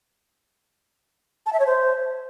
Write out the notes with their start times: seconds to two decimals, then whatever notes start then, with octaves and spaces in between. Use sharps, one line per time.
1.46 A5
1.53 E5
1.59 C#5
1.66 C5